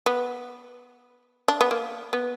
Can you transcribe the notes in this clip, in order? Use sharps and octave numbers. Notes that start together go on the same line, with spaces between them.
B3
D4
B3
A#3
B3